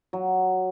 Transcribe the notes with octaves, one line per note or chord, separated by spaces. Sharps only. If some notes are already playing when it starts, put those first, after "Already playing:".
F#3